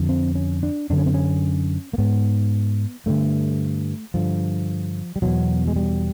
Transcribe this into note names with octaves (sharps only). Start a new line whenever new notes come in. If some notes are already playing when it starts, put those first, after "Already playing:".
Already playing: F2 D3
C4
C#4
D4
F#2 D3 D4
C#4
C4
C#4
A#3
G#2 B3
G2 D3 A3
G2 D3 F3
G3
E2 B2 F#3
G#3
G3